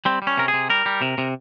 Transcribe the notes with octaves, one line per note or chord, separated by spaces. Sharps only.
G3 C4
G3
C#4
C3 A#4
G#4
C3
G3 A#4
G3
C3
C3